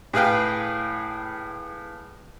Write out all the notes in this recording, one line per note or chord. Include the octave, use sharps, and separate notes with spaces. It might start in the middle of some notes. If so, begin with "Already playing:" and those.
A2 G#4 B4 F5 G5